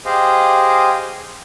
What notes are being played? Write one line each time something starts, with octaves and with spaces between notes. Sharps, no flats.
G4 G#4 C5 D#5 F5